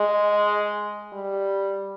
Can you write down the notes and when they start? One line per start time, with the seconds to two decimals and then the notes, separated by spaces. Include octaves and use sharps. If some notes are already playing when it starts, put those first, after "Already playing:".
Already playing: G#3
1.13 G3